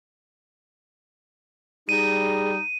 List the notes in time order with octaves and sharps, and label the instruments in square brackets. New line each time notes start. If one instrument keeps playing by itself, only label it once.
[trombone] G3 [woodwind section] D#4 [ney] G#4 [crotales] D#7